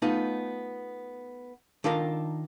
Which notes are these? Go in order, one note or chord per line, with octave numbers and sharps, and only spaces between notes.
A3 B3 D#4 F4
D#3 D4 F4 A4 A#4 A#5